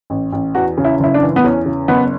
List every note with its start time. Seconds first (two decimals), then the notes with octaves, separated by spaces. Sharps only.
0.10 A1
0.32 A1
0.55 E2 F#4
0.78 C#3
0.85 E4
1.00 F#1 E4
1.14 D4
1.22 E3
1.36 B3
1.44 E2 C#4
1.66 C#3
1.88 F#1 B3